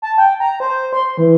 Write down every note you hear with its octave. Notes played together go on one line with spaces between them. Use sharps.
A5
G5
A#5
C5
C6
E3